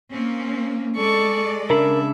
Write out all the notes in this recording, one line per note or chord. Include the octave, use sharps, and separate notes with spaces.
A#3 C4 C#4
G#3 A4 D5 C#6
C#3 D4 A#4 E5 B5